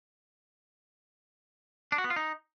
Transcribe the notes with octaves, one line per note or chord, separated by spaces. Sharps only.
D4
F#4
B3
F4
D#4